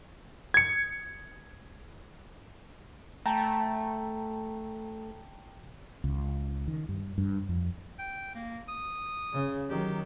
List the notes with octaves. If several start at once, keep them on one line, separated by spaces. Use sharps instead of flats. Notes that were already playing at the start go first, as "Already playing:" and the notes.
G#6 C#7
A3 G5 A5 A#5
C#2
D#3
G2
G2
F2
G5
A#3
D#6
C#3
D#3 F#3 G4